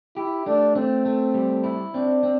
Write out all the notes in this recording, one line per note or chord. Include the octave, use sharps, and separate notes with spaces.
E4 G4
A3 D4
A3 C4
A3
G3
E4
C4 D4
C4